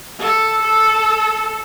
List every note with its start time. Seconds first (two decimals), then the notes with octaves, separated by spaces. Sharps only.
0.20 A4
0.61 A4